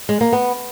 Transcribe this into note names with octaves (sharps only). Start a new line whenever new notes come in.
G#3
A#3
B3